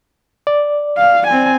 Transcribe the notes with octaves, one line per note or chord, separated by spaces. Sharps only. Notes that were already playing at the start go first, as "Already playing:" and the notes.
D5
F5
C4 G#5